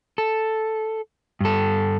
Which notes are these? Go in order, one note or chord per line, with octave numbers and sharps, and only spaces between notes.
A4
G2 A4